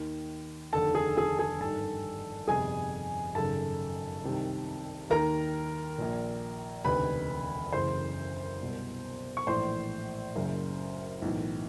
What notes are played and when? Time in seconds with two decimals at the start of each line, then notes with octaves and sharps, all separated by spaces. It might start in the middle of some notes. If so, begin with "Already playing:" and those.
Already playing: D#2 D#3
0.73 F1 D#2 D3 A4 A5
0.95 G#4 G#5
1.17 G#4 G#5
1.39 G#4 G#5
1.60 G#1 G2 D#3 A4 A5
2.48 G1 F2 C3 G#4 G#5
3.35 G#1 F#2 C#3 A4 A5
4.24 C2 C3 D#3
5.10 D#2 D#3 A#4 A#5
5.98 A#1 A#2
6.85 E1 D2 C3 D#3 B4 B5
7.72 F#1 F#2 C#3 E3 C5 C6
8.60 C2 B2
9.37 C#6
9.47 A#1 A2 E3 C5 C6
10.35 F#1 F#2 C#3
11.22 B1 A2 E3